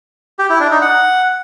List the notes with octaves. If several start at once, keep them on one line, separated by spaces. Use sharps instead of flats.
G4
E4
D4
D#4
F#5